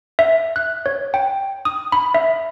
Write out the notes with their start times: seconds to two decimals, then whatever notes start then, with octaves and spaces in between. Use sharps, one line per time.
0.19 E5
0.56 F#6
0.86 C#5
1.14 G5
1.65 D#6
1.92 B5
2.14 E5